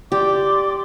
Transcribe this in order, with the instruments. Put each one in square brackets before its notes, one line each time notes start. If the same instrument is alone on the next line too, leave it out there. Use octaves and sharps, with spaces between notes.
[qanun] G4 [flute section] D5 C6 D6